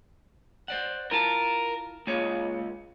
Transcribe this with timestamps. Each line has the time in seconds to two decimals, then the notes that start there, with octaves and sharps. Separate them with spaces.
0.68 C5 D5 F#5
1.11 E4 F4 A#4 A5
2.07 C#2 A#3 G#4 C#5